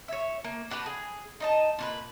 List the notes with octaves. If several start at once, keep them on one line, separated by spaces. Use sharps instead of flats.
C#5 E5
A#3
D4 F#4 G4 B4
G#4
D#4 D#5 A5
A#2 F#4 B4